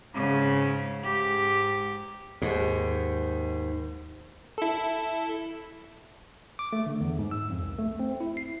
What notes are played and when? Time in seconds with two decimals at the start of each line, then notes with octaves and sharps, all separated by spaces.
0.14 G#2 C#3
1.04 G#2 G4
2.42 D#2 G#2
4.58 E4 A4
6.59 D6
6.73 A3
6.86 D3
7.01 E2
7.19 G#2
7.31 E6
7.50 F2
7.62 C2
7.79 A3
8.00 C4
8.20 E4
8.37 C7